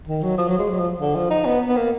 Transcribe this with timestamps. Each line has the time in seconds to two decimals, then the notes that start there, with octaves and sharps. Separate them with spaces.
0.08 D#3
0.23 F#3
0.38 F3
0.48 F#3
0.58 G#3
0.69 F#3
0.79 F3
1.00 D3
1.16 F3
1.30 D#4
1.45 B3
1.69 B3
1.77 A#3